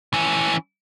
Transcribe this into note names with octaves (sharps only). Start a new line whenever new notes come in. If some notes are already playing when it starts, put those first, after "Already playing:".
E3 C#4